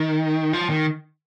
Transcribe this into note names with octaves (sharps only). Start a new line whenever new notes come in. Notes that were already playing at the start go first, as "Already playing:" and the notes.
Already playing: D#3
F3
D#3